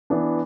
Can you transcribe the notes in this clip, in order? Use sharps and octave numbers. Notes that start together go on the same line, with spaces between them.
E3 B3 D4